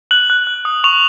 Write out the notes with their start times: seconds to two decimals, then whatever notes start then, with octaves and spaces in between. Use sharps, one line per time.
0.11 F#6 F#7
0.30 F#6
0.47 F#6
0.65 D#6
0.84 C#6 F7